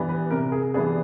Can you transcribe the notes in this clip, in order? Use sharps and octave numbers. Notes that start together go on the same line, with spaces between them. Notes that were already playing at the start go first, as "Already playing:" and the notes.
Already playing: E3 G3 B3 D4
B4
C3 A#4
G#4
E3 G3 B3 D4 G#4